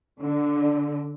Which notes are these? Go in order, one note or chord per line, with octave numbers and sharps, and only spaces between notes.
D3